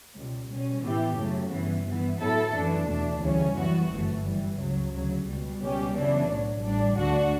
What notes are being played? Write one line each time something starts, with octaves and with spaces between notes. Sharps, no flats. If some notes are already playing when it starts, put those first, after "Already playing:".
C#2 B2 G3
B2 G3 C#4
A2 E3 B3 E4 G4
F#2 C#3 F#3 A3
G2 E3 B3
G2 E3 B3
A2 F#3 B3 E4 A4
F#2 E3 A3 D4
E2 B2 A3 D4
D2 C#3 E3 G3 C#4
F#2 E3 G3 B3 F#4
G1 F#2 E3 A3
F#2 E3 G3
C#2 C#3 F#3
D2 C#3 F#3
C#2 B2 G3
C#2 B2 G3 C#4 G4
F#2 C#3 E3 B3 D4
B1 A2 F#3
A1 A2 G3 D4
D2 D3 A3 D4 F#4